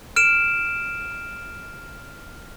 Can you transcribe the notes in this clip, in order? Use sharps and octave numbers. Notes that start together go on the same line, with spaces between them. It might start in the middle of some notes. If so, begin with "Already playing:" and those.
F6 D7 E7